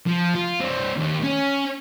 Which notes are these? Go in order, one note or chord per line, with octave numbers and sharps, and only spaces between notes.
F3
F4
C4 D4
D#2
C#4